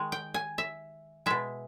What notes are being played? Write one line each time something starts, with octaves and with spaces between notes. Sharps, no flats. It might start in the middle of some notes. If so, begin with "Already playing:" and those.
Already playing: D#3 G#3
G5
G#5
E5
B2 G#3 E5